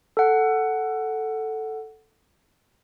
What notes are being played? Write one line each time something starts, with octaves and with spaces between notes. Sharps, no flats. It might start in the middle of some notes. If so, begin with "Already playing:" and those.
A4 F#5